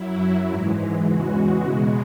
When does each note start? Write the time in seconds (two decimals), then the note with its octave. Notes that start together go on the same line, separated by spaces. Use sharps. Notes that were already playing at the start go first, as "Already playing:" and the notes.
Already playing: F#2 F#3 E4
0.48 G#2 E3 G#3
1.06 E2 C#3 E3 G#3 F#4
1.64 E2 B2 G#3